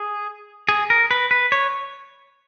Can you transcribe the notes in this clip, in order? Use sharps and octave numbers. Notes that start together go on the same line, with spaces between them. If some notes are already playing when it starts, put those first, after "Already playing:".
Already playing: G#4
G#4
A#4
B4
B4
C#5